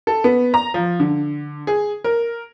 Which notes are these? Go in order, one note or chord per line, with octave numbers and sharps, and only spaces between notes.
A4
B3
A#5
F3
D3
G#4
A#4